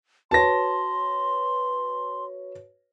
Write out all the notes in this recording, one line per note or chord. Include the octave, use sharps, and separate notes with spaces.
F#4 B4 C#5 A5 C6 A#6